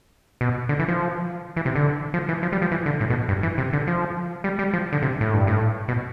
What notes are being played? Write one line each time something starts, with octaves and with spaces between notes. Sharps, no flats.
B2
D3
E3
F3
E3
C3
D3
F3
E3
F3
G3
F3
E3
D3
A2
B2
G2
E3
C3
D3
F3
G3
G3
F3
D3
C3
A2
G2
A2
B2